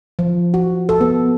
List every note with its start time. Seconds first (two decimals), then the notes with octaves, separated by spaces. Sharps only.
0.19 F3
0.54 F#4
0.89 A4
1.01 B3